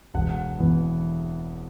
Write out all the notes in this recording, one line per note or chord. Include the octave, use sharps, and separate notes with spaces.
E1 F#5
E2 E3 B3